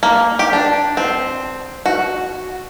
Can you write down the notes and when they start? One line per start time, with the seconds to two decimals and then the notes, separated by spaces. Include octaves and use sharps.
0.03 A#3
0.39 G4
0.53 D4
0.97 C4
1.86 F#4